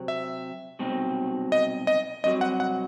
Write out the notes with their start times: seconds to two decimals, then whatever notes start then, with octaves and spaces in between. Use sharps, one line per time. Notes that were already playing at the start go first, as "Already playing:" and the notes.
Already playing: C3 F#3 C4
0.08 E5
0.79 C2 B2 F#3 C4 D#4
1.52 D#5
1.87 D#5
2.24 C2 C3 F#3 D#5
2.41 F#5
2.60 F#5